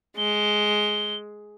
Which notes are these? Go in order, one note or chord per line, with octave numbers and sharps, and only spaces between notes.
G#3 G7